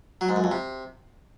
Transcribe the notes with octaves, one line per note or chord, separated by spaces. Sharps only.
F#3
G#2
F#2
F2
C3